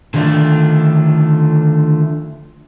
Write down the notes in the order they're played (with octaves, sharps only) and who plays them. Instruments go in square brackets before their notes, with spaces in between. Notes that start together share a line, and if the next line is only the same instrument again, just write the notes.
[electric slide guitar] D3 D#3 F3 A3 D4